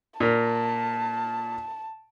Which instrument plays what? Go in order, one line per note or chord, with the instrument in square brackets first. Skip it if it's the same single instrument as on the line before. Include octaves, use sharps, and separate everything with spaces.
[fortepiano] A#2 A#4 [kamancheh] A5